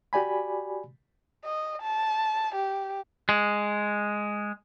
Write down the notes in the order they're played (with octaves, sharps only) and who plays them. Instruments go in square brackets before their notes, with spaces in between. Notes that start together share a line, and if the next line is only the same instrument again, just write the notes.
[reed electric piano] F#4 G4 D5 G#5 B5
[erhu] D#5
A5
G4
[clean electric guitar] G#3